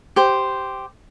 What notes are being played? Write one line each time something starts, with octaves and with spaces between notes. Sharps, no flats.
G4 C5